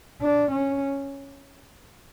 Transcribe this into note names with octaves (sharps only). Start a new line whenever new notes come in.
D4
C#4